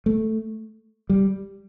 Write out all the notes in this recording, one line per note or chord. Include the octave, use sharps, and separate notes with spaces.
A3
G3